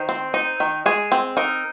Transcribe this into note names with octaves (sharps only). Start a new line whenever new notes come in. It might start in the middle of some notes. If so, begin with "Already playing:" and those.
Already playing: D#3 C5
C4
D#4
D#3
G#3 G#4
C4
D#4 A#4